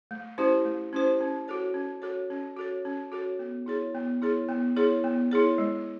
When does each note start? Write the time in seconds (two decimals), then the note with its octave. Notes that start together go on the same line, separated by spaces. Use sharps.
0.11 A3
0.38 C#4 E4 G4 C5
0.65 A3
0.93 C#4 E4 G4 C5
1.21 C#4
1.48 F#4 A4 C#5
1.74 C#4
2.02 F#4 A4 C#5
2.30 C#4
2.57 F#4 A4 C#5
2.85 C#4
3.12 F#4 A4 C#5
3.39 B3
3.66 E4 G#4 C#5
3.94 B3
4.22 E4 G#4 C#5
4.49 B3
4.77 E4 G#4 C#5
5.04 B3
5.31 E4 G#4 C#5
5.58 G#3